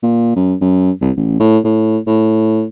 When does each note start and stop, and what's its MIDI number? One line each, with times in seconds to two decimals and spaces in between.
0.03 0.32 46
0.36 0.54 42
0.61 0.91 42
1.01 1.11 36
1.17 1.35 33
1.40 1.59 45
1.64 1.98 45
2.07 2.64 45